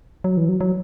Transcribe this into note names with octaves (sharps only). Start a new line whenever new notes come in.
F#3
E3
F#3
F#3